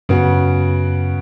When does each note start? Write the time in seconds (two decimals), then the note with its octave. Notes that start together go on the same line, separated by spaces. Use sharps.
0.09 F#2 C#3 B3 F#4